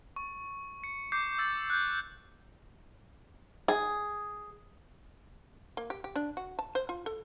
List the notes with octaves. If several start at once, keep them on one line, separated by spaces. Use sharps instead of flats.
C#6
C#7
D6 G6 C7
E6 A6 C7
F#6 G6
G#4
A#3
G4
G4
D4
F#4
A5
C5
F4
A4